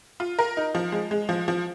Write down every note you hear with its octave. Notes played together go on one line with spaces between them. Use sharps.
F4
A#4
D#4
F3
G#3
G#3
F3
F3